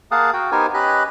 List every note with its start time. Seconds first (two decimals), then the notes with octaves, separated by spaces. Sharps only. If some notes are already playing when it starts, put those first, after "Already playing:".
0.11 A#3 G#4 F5 F#5 A5 D#6
0.33 F#4 G5
0.52 B3 D#4 G4 A#4 C5 G#5
0.74 C#4 G4 B4 D#5 B5 F#6